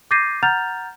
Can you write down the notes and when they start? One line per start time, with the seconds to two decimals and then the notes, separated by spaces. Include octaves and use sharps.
0.11 D6 G6 A6 A#6 C7 D#7
0.43 F#5 A#5 F6 G6 A6 F7